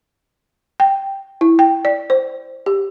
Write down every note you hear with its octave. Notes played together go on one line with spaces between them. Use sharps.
G5
E4
G5
D5
C5
G4